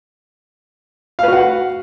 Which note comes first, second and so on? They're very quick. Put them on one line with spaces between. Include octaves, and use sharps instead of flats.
F5 B4 F#4 F#5